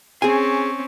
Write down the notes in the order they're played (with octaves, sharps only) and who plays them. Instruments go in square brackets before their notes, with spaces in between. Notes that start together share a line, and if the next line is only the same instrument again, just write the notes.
[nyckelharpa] C4 C#4 [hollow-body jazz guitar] G#4 G#5